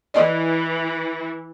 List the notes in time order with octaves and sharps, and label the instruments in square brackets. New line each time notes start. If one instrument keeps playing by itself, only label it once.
[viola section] E3 [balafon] D5 D#5